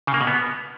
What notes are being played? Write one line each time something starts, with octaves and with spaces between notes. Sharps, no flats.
C#3
A#3
B2
B3